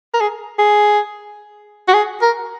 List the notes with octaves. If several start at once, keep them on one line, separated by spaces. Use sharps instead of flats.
A#4
G#4
G#4
F#4
G#4
A#4